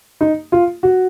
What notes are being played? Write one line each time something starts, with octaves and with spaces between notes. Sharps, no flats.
D#4
F4
F#4